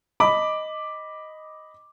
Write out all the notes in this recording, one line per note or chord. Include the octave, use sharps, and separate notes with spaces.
D#5 B5 D6